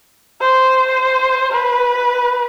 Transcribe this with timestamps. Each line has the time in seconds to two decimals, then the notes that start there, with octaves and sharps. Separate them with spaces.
0.41 C5
1.52 B4